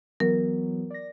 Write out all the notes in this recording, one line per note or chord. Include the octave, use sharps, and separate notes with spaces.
E3 F#3 B3 A#4
D5 A#6